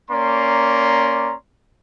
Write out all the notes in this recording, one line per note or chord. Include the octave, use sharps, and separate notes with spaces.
A#3 C#4 D5 A#5 C6